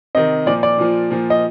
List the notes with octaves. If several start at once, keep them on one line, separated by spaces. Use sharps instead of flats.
C3 D#3 D#5
A#2 F3 D5
D5
A#2 F3
A#2 F3
D#5